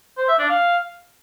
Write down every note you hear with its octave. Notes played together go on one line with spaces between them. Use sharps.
C5
E5
D4
F5